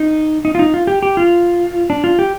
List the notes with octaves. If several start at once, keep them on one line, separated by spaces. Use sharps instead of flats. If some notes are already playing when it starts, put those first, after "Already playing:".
Already playing: D#4
D#4
F4
D#4
F4
G4
G4
F4
D4
F4
G4